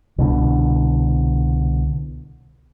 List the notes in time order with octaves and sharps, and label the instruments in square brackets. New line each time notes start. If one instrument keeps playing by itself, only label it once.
[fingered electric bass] C2 B2 D3